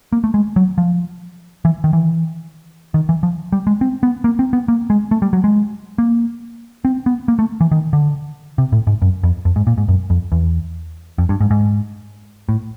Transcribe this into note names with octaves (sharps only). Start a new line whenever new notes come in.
A#3
A3
G#3
F#3
F3
E3
D#3
E3
D#3
E3
F3
G3
G#3
C4
B3
A#3
C4
B3
A#3
G#3
A3
G3
F#3
G#3
A#3
C4
B3
A#3
A3
E3
D#3
D3
C3
A2
G#2
F#2
F2
F2
G#2
A#2
G#2
F#2
F2
E2
F2
G2
G#2
G#2
A2